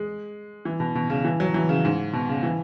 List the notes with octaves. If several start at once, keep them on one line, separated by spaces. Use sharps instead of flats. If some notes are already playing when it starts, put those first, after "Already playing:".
Already playing: G#3
E3
B2
B2
C#3
E3
F#3
E3
C#3
G#2
B2
C#3
E3